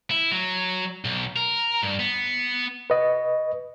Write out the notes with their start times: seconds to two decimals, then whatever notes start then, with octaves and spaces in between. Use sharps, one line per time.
0.11 E4
0.32 F#3
1.05 B1
1.36 A#4
1.83 G2
2.00 B3
2.90 B4 D#5